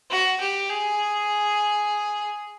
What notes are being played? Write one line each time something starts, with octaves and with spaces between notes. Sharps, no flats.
F#4
G4
G#4